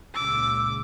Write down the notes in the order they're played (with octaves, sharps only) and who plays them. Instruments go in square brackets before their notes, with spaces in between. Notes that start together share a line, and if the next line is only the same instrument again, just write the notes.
[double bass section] C#2 A#2 C#3 [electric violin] D6 [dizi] E6